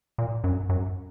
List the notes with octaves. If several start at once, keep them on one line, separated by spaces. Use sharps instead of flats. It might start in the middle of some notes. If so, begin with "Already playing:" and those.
A#2
F#2
F#2